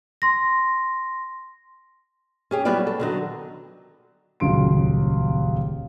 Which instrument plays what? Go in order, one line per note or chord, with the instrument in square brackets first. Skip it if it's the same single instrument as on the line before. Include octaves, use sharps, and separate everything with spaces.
[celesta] C6 A#6
[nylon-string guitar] C#4 G4 G#4
F#3 G3 B3 E4 F4 D5
A4
D3 D#3 F#3
[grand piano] D#1 C#2 F#3 C6 D7